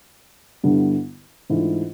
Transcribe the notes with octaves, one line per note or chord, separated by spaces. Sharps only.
G2 D3 G3 B3 E4
G#2 E3 A3 D4 F4